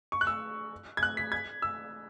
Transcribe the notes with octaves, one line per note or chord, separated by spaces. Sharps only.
C#6
F#6
E6
G#6
F#6
B6
G#6
E6